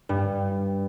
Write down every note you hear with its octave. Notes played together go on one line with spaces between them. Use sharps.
G2